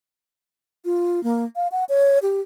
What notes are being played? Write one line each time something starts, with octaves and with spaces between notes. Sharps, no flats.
F4
A#3
F5
F#5
C#5
G4